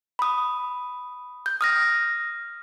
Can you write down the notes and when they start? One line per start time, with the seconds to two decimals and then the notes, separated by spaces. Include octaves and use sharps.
0.19 B5 D#6
1.46 G6
1.61 D#6 F6 A#6